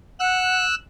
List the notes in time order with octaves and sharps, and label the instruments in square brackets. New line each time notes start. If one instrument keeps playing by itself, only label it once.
[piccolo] F#5 [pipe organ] E6 F#6